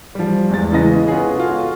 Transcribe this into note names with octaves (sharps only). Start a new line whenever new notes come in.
F3 G3
E2 G#3 A6
C#3 E3 G#3 D#5 A#6
B3 C#4 F4 G#4
F4 F#4 A4